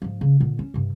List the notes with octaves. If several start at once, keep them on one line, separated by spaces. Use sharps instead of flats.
G#2 F3
C#3
A#2 D3
C#4
G2 C3